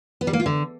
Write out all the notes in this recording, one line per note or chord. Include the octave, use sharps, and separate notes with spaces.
B3
G3
A#3
F4
D3